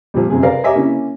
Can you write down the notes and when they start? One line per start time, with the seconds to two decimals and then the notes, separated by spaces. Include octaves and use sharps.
0.14 A#2 F3 G3
0.30 F#2 C3 G#4
0.43 A#4 B4 D5 F5 A#5
0.63 C#5 D#5 E5 G#5 A#5 D6
0.75 A#3 C#4 E4